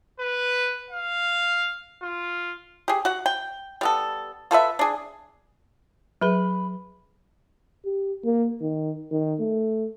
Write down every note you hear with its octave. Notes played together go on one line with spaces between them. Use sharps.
B4
F5
F4
G4 G#4
F#4 F#5
G5
G3 B3 A4
F4 A4 B4 E5
D4 G#4
F#3 G#4 B4
G4
A#3
D#3
D#3
A3